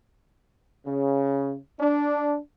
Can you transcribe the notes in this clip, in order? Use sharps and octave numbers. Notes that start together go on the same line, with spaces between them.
C#3
D4